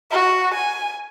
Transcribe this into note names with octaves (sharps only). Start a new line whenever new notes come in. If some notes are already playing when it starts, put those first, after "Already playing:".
F#4
G#5